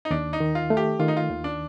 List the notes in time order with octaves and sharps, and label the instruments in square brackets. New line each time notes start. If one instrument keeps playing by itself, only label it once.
[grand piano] D#4
[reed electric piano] D#2 [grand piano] D4
[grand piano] D#4
[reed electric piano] D#3
[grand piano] F4
[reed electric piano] A3
[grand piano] G4
[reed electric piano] D#3 [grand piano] F4
[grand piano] D#4
F4
[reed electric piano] D#2
[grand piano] D4